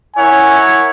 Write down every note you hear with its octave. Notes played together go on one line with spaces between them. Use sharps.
E4 A#4 C#5 F#5 G#5